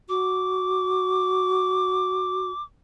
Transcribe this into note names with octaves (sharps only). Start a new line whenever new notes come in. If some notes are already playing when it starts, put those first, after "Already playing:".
F#4 D6